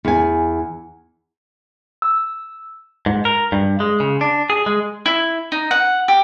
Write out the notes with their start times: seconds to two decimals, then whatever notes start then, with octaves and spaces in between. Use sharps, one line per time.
0.05 E2 G#5
2.02 E6
3.06 G#2
3.25 A#4
3.52 G2
3.80 G#3
4.00 C#3
4.21 D4
4.50 G#4
4.66 G#3
5.06 E4
5.52 D#4
5.71 F#5
6.08 G4